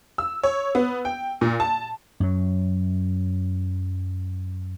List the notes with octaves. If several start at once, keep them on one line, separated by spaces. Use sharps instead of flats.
E6
C#5
B3
G5
A#2
A5
F#2 F#3